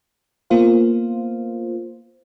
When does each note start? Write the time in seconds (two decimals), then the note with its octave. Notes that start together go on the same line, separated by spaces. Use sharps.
0.50 A#3 B3 F4 C5 F5